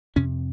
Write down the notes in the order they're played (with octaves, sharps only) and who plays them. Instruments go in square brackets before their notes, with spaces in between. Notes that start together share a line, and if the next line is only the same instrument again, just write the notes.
[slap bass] F2 C3 C#4